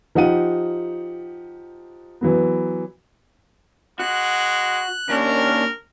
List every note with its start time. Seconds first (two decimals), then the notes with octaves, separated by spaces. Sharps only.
0.15 F3 D#4 G4 F#5 D#7
2.21 E3 F#3 B3
3.99 G#3 F#4 F#6
5.09 D#2 C#4 D4 A#4